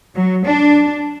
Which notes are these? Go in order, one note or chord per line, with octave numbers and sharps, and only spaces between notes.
F#3
D4